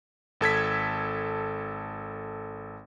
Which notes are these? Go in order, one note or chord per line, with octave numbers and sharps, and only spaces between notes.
G#1 A4 G#6 B6